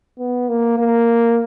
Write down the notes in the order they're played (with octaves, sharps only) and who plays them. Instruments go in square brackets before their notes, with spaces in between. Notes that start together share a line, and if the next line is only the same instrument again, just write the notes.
[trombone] B3
A#3
A#3